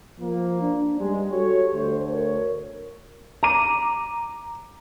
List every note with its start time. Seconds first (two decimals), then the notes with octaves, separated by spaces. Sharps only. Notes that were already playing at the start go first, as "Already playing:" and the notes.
0.20 F3 A#3
0.62 D4
1.00 G2 G3 G#3
1.32 F#4 G4 A4 C#5
1.73 D2 A3 C5
2.12 A#4 C#5
3.43 A#5 D6 D#7